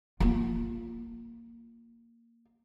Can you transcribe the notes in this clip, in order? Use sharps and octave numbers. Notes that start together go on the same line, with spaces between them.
A#3 F4